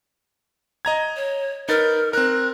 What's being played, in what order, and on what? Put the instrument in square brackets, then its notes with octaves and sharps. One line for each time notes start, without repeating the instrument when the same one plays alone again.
[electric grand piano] D#5 A#5 G#6
[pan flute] C#5
[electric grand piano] D#4 B4 A6 [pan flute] A#4
[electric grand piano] C4 A#4 [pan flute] F#6